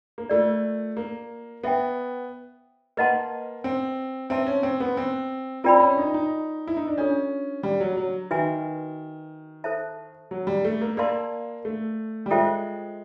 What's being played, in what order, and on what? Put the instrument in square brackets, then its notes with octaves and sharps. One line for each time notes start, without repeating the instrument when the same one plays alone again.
[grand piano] A#3
[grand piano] A3 [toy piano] F4 A#4 D5
[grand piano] A#3
[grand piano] B3 [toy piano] C5 E5 G5
[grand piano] A#3 [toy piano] B4 D#5 F#5 A5 C6
[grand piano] C4
[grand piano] C4 [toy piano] B4 E5 A5 C6
[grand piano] C#4
C4
B3
C4
[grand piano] C4 [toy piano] F4 A#4 D5 G5 B5
[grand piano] C#4
D#4
D#4
E4
D#4
D4
[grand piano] C#4 [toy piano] D4 F4 A4
[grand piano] G3
F#3
F#3
[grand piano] D#3 [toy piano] F#4 B4 E5 G#5
[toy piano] A4 C5 E5 A5
[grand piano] F#3
G3
A3
A#3
[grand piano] A#3 [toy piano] A#4 D5 F5 A5 C6
[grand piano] A3
G3
[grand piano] G#3 [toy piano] F4 A4 C5 E5 G5